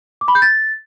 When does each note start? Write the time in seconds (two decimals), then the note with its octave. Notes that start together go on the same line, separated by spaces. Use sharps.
0.21 D6
0.28 B5
0.35 G6
0.42 A6